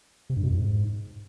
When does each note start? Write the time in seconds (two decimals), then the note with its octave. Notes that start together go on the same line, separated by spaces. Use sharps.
0.30 C3
0.37 G2
0.43 B2
0.50 F2
0.57 G#2